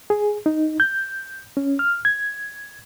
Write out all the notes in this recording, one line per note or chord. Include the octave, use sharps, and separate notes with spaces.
G#4
D#4
G6
C#4
F6
G#6